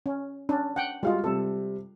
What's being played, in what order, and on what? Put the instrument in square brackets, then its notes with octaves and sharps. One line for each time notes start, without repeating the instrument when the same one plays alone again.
[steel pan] C#4
C#4 D4
F#5 G5
[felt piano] G3 F#4 F5 [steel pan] G#3 F4
[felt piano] C3 G3 [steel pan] A4